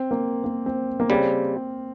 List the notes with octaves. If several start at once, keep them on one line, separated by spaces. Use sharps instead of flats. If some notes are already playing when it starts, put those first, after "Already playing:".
Already playing: C4
A#3
A#3
C4
A#3
C#3 G3 C4